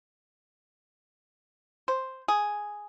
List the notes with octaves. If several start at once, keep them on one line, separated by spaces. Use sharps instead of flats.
C5
G#4